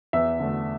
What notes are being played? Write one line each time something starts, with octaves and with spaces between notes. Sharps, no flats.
E2 E5
D3 A3